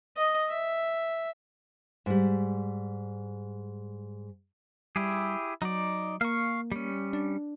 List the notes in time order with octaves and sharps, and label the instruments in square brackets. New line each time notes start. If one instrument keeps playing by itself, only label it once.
[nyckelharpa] D#5
E5
[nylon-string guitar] G#2 G3
[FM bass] G3 [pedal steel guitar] E4 G4 G#4
[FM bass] F#3 [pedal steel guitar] D#4 D5
[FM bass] A#3 [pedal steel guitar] F5 C#6
[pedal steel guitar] G3 C#4
[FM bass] D4